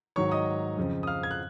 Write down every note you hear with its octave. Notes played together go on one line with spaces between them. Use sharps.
G#2 D#3 F#3 C#5 C#6
D#5 D#6
F2 C#3 F3
D#6
F5 F6
G#6
F#6